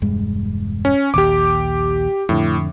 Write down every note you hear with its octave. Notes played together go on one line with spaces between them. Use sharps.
E1 G2 G#3
C#4
A#1 D#2 G4 D6
F2 A2 D3